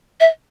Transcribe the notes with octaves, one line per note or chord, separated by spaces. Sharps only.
E5